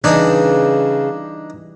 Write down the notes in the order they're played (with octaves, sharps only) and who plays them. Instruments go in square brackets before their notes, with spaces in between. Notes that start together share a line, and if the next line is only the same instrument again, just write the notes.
[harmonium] C#3 [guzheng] E3 G3 [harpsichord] D4 D#4